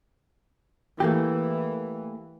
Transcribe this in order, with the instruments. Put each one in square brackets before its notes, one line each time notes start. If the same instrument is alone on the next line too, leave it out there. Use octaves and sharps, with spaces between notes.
[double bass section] E3 [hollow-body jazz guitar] A3 A#3 G4